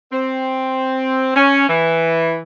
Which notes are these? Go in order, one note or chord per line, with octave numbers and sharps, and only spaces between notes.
C4
C#4
E3